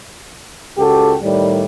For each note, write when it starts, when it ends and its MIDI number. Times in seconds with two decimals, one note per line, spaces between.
0.78 1.14 37
0.78 1.14 66
0.78 1.14 67
0.78 1.14 69
1.22 1.64 45
1.22 1.64 51
1.22 1.64 55